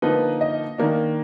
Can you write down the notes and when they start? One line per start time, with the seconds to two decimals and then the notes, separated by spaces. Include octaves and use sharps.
0.02 D3 F3 A#3 D#4 B4
0.41 D#5
0.78 D#3 A#3 D4